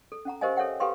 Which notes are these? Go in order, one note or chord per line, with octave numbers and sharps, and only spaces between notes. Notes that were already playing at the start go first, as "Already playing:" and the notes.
A4
C#4 F#5 A#5
G4 A#4 C5 D#5 F5 G#5
A4 C#5 E5 F#5 G5
G4 A4 B4 F5 G5 C6